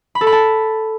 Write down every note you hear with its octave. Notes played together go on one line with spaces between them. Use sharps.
B5
A4
B5
A5